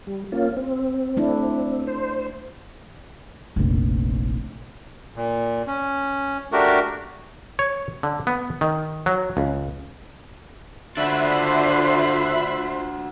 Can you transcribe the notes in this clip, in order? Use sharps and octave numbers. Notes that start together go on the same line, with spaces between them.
G3
A#3 C#4 F4
C4
A3 D4 E4
C5
F1 A#1
A#2
C#4
A3 D4 F#4 G4 A#4
C#5
D3
B3
D#3
F#3
C#2
D3 D4 F4 F#4 C5 E5 B5 F#6